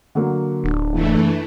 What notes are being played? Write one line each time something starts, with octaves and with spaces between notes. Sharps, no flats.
D3 F#3 A#3
D1 D4
F#1 E3 A3